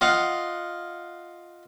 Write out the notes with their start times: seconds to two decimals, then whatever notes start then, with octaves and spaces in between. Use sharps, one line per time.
0.01 F4 D#5 F5 F#5